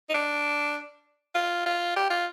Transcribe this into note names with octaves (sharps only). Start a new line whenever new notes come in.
D#4
D4
F4
F4
G4
F4